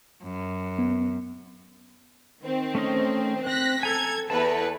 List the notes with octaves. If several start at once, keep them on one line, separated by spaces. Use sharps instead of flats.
F#2
B3
D#3 C4
A3 C#4 D#5
C4 F#6 A#6 B6
A4 G#5 A#5 E6 G#6
E2 A4 B4 A5